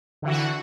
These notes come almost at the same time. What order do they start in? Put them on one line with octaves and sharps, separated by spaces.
D3 E3 F#4